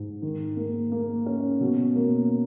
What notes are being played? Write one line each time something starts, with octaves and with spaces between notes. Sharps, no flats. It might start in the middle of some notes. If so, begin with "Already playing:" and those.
Already playing: G#2
D#3
A#3
A#3
C#4
B2
A#3